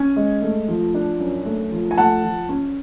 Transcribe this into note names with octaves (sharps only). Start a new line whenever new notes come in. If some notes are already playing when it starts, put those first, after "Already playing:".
Already playing: C#4 G#5
G#3
A3
F3
D4
F#2
A3
F3
G#5
A3 F#5 A5
F3
C#4